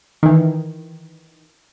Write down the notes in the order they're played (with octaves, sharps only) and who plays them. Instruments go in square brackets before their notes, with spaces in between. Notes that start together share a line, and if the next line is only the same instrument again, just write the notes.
[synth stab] D#3 E3